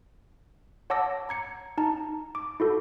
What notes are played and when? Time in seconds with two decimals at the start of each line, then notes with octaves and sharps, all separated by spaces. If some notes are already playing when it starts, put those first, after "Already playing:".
0.90 C#5 F#5 A5 D6 E6 A#6
1.29 A#5 G#6 C#7
1.78 D#4 A5 A#5
2.35 D6
2.60 E4 F#4 A4